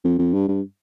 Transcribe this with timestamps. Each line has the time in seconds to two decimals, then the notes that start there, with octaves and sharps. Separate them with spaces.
0.04 F2
0.18 F2
0.34 G2
0.48 G2